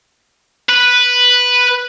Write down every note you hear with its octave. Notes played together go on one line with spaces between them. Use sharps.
B4